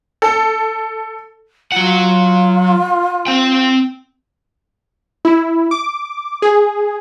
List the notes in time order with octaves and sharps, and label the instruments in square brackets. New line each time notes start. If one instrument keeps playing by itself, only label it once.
[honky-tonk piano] A4
[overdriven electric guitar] F#3 F#5 [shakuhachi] F4
[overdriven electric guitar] C4 G5
[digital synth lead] E4
D6
G#4